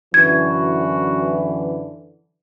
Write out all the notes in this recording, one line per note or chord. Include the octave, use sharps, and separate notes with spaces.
F#2 D3 E3 F#4 G#6